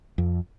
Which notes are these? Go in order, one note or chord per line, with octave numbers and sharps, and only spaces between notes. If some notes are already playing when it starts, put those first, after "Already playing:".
F2